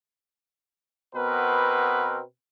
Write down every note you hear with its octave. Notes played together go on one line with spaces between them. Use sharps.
B2 B3 C4 A#4 B4